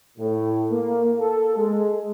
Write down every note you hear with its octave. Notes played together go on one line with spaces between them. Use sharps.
A2
A#3
A4
G#3